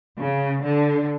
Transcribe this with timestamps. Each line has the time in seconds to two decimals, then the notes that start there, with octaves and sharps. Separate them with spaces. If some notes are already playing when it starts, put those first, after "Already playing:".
0.19 C#3
0.64 D3